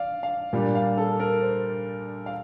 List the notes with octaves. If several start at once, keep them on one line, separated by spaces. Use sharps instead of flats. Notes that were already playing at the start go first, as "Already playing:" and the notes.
Already playing: D5 F5
F5
A#2 G3 A#3 D4
F5
A4
A#4
C5
F5